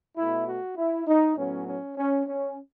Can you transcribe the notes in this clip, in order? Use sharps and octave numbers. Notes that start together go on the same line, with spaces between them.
B2 A3 E4
F#4
E4
D#4
A2 F#3 B3 C#4
C#4
C#4
C#4